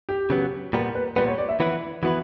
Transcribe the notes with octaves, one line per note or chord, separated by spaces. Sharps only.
G4
C#3 F#3 B3
A#2 G3 B3 A#4
B4
A#2 G3 B3 B4
C#5
D5
E5
E3 B3 E4 B4
E3 B3 E4 F#4 B4